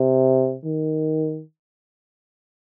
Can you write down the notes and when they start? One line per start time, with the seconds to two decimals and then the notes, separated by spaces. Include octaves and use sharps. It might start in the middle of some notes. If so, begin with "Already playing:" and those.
Already playing: C3
0.65 D#3